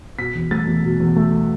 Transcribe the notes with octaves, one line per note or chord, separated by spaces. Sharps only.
B2 B6
E2
A3 A6
E2
B2
E2
A3